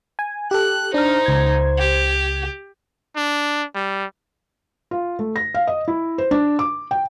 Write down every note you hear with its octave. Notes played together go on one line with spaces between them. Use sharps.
G#5
G4 A4 F#6
D4 D#4 C5 F6
C#2 G#6
G4
D4
G3
F4
A3
A#6
F5
D#5
E4
C5
D4
D6
G5